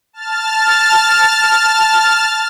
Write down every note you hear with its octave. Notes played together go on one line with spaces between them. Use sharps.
A5 F6 A6